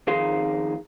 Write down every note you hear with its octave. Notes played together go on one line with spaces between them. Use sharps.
F2 D#3 D#4 G#4 F5 C6